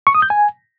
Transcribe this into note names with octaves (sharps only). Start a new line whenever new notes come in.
C#6
D#6
G6
G#5